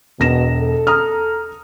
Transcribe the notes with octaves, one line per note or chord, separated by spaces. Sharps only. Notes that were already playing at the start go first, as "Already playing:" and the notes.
E1 B2 A#6 E7
A4
A#5 D#6 F6